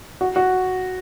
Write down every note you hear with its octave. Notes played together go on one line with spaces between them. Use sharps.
F#4
F#4